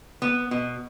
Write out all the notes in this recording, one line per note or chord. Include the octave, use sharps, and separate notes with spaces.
B3
B2